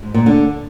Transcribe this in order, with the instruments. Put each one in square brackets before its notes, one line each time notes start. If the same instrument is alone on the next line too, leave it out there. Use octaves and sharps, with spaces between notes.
[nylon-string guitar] G#2
A#2
D3